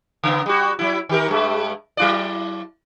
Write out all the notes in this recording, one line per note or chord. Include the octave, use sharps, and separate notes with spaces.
C#3 B3
G3 F#4
F#3 E4
D#3 G4 A#4
G2 G#3
F#3 E4 D5